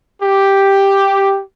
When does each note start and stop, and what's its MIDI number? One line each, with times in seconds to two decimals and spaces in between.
0.23 1.40 67